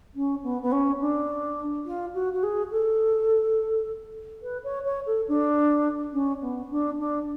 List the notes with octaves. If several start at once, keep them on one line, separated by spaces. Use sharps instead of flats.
C#4
B3
B3
C#4
D4
F4
F#4
F#4
G#4
A4
B4
C#5
C#5
A4
D4
C#4
B3
D4
D4